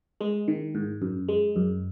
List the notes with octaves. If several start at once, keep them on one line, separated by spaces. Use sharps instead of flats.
G#3
D#3
G#2
F#2
G#3
F#2